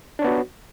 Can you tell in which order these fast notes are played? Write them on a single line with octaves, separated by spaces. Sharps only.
D4 C#5 B3 F#4